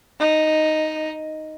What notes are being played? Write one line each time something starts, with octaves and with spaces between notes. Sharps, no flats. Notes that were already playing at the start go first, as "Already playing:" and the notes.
D#4